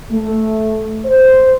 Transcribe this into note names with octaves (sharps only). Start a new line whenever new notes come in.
A3
C5